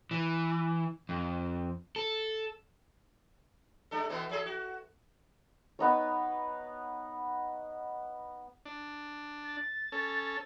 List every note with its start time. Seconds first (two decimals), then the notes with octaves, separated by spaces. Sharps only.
0.11 E3
1.09 F2
1.96 A4
3.91 G3 D4 A4
4.09 B2 E3 B3
4.30 F3 G#4 A4
4.46 F#4
5.79 B3 D#4 C#5
8.65 D4
9.45 A6
9.92 C#4 A4